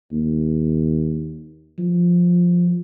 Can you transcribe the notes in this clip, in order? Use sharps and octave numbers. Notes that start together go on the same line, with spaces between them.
D#2
F3